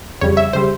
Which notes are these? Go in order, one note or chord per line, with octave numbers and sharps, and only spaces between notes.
F2 C#3 G3 C#5
E5
C#3 G3 C5